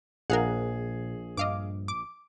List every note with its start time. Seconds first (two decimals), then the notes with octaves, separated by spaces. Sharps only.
0.30 A#1 A#2 G#4 A#4 F5 F#5
1.37 G2 D#5 F5 D6
1.88 D6